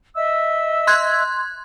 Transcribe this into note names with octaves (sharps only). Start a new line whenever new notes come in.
D#5 E5 E6
C6 F#6 G#6